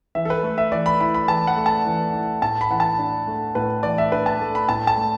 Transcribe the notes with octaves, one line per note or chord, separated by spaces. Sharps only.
E3 E5
A4
B4
A3
E5
E3 D5
B5
E4 B5
B5
E3 A5
F#5
A3
A5
E3
E4
A2 A5
B5
E3 F#5
A5
D4
A3
A2 B4
E3 D5
E5
D4 B4
A5
A3
B5
A2 A5
A5
A3